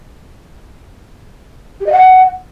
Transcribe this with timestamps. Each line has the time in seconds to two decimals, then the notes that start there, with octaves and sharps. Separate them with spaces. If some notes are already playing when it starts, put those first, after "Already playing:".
1.80 G4
1.86 D#5
1.92 F#5